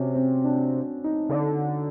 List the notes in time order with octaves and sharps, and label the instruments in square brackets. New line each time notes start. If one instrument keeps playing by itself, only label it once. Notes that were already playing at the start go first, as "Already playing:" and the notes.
Already playing: [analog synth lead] C3 [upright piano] C#4 F#4
[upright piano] C4
D4
D#4
[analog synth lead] C#3
D3